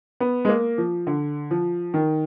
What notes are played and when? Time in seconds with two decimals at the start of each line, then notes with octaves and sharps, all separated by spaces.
0.20 B3
0.45 G#3
0.49 A#3
0.78 F3
1.07 D3
1.51 F3
1.94 D#3